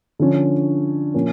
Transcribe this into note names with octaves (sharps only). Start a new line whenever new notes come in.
D3 F3 C#4
A#2 F3 A#3 C#4